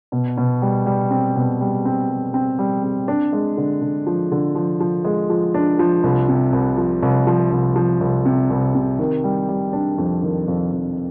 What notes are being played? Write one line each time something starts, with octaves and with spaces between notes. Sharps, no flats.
B2
B2
G3
G3
C4
B2
G3
C4
G3
C4
G3
C4
D4
G#3
D3
D3
F3
D3
F3
F3
G#3
F3
D4
F3
C2
C3
C2
F3
C2
F3
C2
F3
C2
C3
C2
C3
D#3
G3
G3
D4
F2
D#3
F2
F2